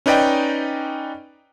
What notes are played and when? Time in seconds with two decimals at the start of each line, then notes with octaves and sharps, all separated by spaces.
0.06 C#4 D#4 B4 D5 D#5 G5